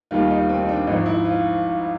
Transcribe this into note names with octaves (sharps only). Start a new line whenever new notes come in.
D#2 D#3 G3 F4
D#4
C4
D#4
D4
G#1 G#2 F3 D#4
E4
F4